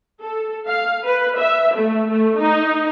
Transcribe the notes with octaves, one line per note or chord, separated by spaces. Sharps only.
A4
F5
B4
E5
A3
A3
D#4